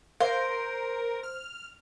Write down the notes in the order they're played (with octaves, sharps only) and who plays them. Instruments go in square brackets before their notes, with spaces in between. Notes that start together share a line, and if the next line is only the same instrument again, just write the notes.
[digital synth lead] A#4 [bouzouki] C5 [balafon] F5
[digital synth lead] F6